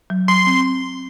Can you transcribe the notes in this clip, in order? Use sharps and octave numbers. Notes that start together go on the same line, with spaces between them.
F#3
F#3 C6
C4